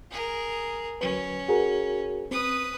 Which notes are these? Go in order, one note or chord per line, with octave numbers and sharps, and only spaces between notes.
G#4 A#4
D2 F#3 C#4 B4
F#4 G#4 A#4
C4 B4 D#6